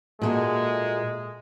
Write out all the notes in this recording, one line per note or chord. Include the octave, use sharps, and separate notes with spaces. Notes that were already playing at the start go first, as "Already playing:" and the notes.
A#2 G#3 A3 F#4